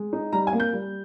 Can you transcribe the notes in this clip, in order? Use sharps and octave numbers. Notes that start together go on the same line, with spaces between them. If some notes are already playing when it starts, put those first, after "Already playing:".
Already playing: G#3
D#4
G3 A#5
G#5
A#3
G6
G3